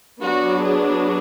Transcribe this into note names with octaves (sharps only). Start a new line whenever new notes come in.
F#3 B3 D4 F#4
G#4